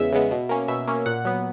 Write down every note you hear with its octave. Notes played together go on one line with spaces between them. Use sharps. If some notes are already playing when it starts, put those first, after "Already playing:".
Already playing: E2 C#3 G#3 B3 E5
C#3 G#3 B3
B2
A#3 C#4
B2 E5
A#3 C#4
A#2 F#5
F#3 B3